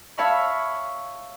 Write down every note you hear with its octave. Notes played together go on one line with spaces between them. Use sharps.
C#5 E5 F5 A5 B5 C#6